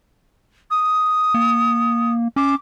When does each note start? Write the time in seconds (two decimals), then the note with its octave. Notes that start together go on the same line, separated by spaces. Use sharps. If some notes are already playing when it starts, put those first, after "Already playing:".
0.70 D#6
1.34 A#3
2.36 C#4 D6